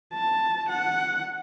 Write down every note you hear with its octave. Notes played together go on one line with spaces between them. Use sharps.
A5
F#5